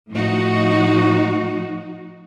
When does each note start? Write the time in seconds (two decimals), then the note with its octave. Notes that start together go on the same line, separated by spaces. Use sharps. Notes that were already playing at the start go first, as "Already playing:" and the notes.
0.10 A2 F3 D#4 F#4